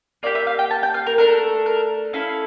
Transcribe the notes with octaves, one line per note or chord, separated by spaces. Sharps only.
A#3 E4 G4 D5
E5
F5
G5
A5
G5
F5
A#4
A3 D4 A4 A#4
A#4
C#4 E4 A4 F5